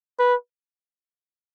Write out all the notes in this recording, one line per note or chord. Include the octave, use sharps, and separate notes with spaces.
B4